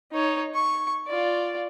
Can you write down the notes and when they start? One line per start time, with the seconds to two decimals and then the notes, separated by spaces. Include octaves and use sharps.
0.12 D#4 C#5
0.54 C#6
1.07 F4 D5